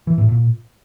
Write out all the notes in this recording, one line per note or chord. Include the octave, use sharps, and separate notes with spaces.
E3
A2
A#2